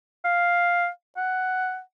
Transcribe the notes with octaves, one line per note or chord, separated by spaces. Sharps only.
F5
F#5